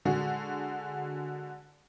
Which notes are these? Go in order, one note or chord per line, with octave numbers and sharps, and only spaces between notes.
D3 G#3 F#4 G#4